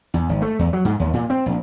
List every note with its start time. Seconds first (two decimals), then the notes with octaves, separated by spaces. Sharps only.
0.14 E2
0.29 G#1
0.42 A3
0.59 E2
0.73 F#3
0.85 G#2
1.00 D#2
1.13 A#2
1.30 C4
1.46 A#1